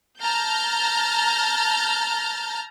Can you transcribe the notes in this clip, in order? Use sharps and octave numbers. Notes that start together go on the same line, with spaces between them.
A5 A#5 F6 G6 A6